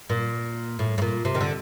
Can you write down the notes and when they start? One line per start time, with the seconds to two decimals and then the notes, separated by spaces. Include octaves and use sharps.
0.10 A#2
0.79 A2
0.98 A2
1.02 A#2
1.25 C3
1.35 D#3
1.41 D3